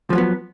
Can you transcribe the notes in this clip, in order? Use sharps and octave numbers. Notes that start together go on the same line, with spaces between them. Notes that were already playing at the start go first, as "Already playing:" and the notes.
F3 F#3 G#3 B3